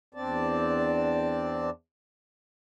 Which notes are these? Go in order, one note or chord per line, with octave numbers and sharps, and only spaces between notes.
E2 C4 D4 D5 A5